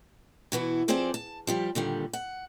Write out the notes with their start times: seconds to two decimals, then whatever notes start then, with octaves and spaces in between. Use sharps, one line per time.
0.52 B2 E3 B3 E4
0.88 F3 C4 G#4 A4 C5 D5
1.14 A5
1.47 F3 G3 G4
1.75 A#2 D3 D#3 G3
2.13 F#5